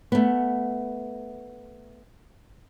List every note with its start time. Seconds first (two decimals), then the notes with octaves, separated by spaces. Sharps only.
0.12 A3 B3